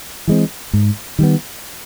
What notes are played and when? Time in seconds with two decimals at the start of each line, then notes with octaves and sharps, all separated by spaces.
0.27 E3 G#3 C4
0.73 G#2
1.19 D#3 G3 B3